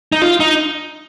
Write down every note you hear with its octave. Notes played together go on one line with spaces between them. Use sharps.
D#4
F4
D#4